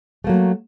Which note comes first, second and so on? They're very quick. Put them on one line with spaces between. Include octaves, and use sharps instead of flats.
A3 A#3 F#3